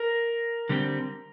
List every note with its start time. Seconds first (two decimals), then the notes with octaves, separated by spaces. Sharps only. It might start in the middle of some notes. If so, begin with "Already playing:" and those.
Already playing: A#4
0.69 D3 G3 C4